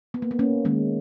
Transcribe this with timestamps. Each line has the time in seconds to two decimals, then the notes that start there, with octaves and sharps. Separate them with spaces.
0.14 B3
0.22 A#3
0.31 B3
0.39 A#3 C#4
0.65 D#3 G#3 A#3 C#4